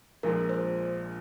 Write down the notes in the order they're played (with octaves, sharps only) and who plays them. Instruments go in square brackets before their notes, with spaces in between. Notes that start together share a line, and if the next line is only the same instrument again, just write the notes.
[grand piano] A#1 A#2 F3 G#3 [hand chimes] A#4
[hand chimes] C5